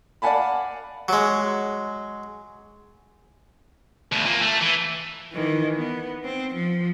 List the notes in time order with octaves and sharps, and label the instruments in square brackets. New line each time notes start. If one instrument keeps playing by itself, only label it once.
[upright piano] D5 F5 F#5 G#5 A5 B5
[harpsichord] F#3 G#3
[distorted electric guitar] D2 B2
A#2 A#3
A3
E3
[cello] D#3 E3
B3
C4
F3